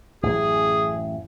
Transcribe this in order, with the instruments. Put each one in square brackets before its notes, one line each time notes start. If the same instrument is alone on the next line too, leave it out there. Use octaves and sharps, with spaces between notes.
[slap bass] A1 F#2 [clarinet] G#4